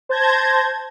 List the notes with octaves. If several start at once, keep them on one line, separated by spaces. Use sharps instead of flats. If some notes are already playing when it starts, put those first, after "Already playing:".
C5 A5 G6 G#6 A#6